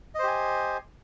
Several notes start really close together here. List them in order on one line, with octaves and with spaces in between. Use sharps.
D#5 C5 G4 G#5